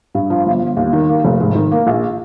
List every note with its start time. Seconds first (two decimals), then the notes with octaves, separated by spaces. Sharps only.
0.14 G2
0.30 F3
0.46 G1
0.61 G1
0.77 D#2
0.93 D#3
1.09 A#3
1.24 F1
1.40 G#2
1.55 D#3
1.71 A#3
1.87 A#1